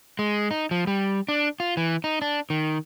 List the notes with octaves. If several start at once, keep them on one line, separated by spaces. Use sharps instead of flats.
G#3
D#4
F3
G3
D4
F4
E3
D#4
D4
D#3